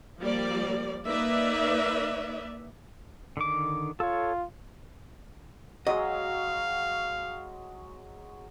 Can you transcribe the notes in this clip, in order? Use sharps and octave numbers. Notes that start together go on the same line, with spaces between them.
F3 G3 A#3 D5
A#3 D#4 B4 D5 E5
D3 D#3 D6
F4 A4 C#5
F#3 G#3 D#5 F5